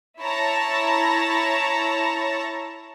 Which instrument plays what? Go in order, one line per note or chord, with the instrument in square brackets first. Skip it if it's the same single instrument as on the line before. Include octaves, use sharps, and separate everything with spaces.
[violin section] E4 C#5 A5 A#5